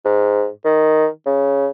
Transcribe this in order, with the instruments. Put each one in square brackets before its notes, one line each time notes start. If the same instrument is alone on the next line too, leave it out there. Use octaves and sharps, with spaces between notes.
[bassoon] G#2
D#3
C#3